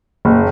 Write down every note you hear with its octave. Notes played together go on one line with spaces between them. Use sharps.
F#1